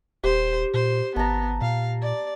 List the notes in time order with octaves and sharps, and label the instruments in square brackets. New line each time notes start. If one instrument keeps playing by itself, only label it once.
[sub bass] D#1 [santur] G4 [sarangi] C5
[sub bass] A#2 [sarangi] C5
[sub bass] G#1 [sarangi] B3 [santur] A5 A#5
[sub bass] A#2 [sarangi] F5
[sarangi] D5